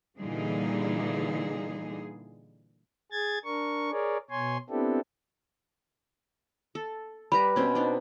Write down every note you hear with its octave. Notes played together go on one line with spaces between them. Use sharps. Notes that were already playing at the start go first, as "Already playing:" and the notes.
A#2 D3 E3 G3 D#4 G#4
G#4 G#6 A6
D4 A#4 C#6
G#4 A#4 C#5 D5
B2 C#5 G#5 C6
B3 C4 D4 E4 G4 A4
A4
G3 B4 A#5 B5
B2 C4 C#4
D4 D#4